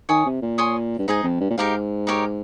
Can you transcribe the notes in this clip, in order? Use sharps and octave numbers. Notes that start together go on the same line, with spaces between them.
D#3 C#5 G#5 D#6
C3
A#2
C#5 G#5 C6 D#6
G2
G#2 D#4 G#4 D#5 G#5
F2
G2
A#2
G#2 D#4 G4 A#4 F5
D#4 G4 A#4 C#5